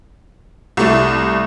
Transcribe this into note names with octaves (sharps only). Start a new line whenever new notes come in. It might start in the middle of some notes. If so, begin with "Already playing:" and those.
C2 A3